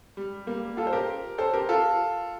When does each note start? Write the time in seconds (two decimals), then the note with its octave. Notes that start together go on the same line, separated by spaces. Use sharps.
0.17 G3
0.47 G3 A#3
0.77 F4 A4
0.87 C5
0.93 G4 A#4
1.38 A4 C5
1.54 G4 A#4
1.69 F4 A4